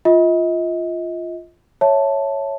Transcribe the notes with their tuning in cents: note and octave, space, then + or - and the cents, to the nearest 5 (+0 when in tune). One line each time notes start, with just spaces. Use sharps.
F4 -5 D#5 +35
C#5 +0 E5 +0 A5 +0